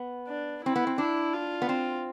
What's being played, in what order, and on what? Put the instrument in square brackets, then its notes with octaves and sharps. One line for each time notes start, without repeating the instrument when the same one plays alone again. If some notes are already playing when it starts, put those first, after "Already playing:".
Already playing: [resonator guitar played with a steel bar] B3
[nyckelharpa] D4
[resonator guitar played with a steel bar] C4 [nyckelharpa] E4
[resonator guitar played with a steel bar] B3
C4
[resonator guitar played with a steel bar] D4 [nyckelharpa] E4
[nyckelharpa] F4
[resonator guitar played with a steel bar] B3
C4